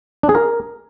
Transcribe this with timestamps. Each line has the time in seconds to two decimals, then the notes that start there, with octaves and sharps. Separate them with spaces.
0.23 D4
0.29 G#4
0.35 A#4